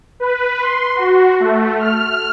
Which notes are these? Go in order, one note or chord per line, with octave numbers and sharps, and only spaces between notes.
B4
C6
F#4
A3
F6